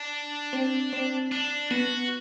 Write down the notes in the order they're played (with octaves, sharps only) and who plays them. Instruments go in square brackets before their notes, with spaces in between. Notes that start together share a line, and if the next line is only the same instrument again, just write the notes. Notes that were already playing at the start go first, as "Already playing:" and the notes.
Already playing: [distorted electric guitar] D4
[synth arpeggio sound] C4
C4
[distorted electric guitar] D4
[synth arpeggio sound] B3 [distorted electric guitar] F#4